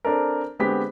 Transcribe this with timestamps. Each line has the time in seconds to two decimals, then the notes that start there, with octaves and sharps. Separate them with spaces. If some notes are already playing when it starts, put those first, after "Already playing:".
0.05 C4 D4 A4 A#4
0.59 D3 G#3 B3 C4 G4 B6